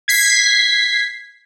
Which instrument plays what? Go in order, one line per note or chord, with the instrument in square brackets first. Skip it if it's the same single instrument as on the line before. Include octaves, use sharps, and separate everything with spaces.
[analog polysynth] G#6 B6 C7